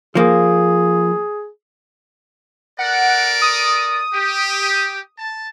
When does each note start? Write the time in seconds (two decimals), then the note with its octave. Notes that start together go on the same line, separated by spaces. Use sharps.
0.15 F3 A#3 G#4
2.79 A4 A#4 D5 F#5
3.42 D#6
4.13 G4
5.18 A5